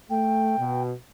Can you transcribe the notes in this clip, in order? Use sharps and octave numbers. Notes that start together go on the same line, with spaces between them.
A3 G5
B2